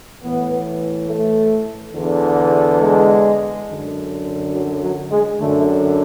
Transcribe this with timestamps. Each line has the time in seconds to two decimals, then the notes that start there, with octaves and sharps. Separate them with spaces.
0.22 A2 E3 B3
1.09 A3
1.94 E2 D3
2.80 G#3
3.67 F#2 D3
4.52 F#3
4.81 F#3
5.10 G#3
5.39 F#2 D3 A3